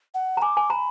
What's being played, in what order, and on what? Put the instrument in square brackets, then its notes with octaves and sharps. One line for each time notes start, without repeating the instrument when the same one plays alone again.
[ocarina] F#5
[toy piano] A#5
[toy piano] G#5 [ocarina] D6
[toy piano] G#5
[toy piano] A#5 [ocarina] B5